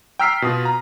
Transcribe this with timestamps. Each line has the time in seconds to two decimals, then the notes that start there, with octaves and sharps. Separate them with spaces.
0.19 G5 A#5 E6 F6 B6 C7
0.42 B2 F4 D#6
0.65 A#5